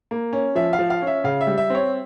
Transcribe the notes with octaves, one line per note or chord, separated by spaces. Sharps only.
A#3
C#4
F3 E5
F5
F3
F5
C#4
E5
C#3 F5
E5
G3
E5
C4 C#5